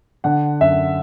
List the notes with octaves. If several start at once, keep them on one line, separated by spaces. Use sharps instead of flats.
D3 F#5
F#2 E5